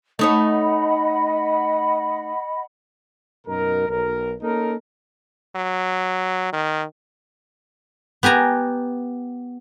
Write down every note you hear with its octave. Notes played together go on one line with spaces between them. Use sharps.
A3 D#4 C#5 D#5 F#5 B5
F#2 B2 D#4 A#4
B1 A#4
A#3 C#4 D#4 A4 A#4
F#3
D#3
B3 G4 G#5 A#5